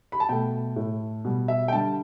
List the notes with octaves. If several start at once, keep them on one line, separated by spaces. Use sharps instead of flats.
B5
A5
B2 A3 G5
A2 A3
B2 G3
E5
G5
D3 G3 A5